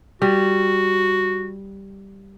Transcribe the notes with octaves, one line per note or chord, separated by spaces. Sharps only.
G3 F#4